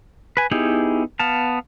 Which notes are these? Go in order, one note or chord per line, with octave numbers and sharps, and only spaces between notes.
B4 G#5
B3 D#4 E4 G4 G#4
B3 F5 A5